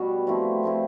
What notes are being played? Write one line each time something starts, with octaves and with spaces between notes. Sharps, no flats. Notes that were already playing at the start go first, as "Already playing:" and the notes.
Already playing: B2 G3 B3 F#4
F3 A3 C4 E4
F3 A3 C4 E4